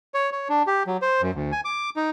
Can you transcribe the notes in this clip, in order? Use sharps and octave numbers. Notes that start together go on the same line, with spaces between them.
C#5
C#5
D4
G4
F#3
C5
F#2
D2
G#5
D6
D#4